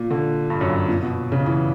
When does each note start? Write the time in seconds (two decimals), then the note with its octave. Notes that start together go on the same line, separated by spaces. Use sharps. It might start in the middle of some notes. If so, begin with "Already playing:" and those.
Already playing: A#2
0.11 D3
0.50 G2
0.61 F#2
0.69 G2
0.89 A#2
1.02 B2
1.32 C#3
1.46 E3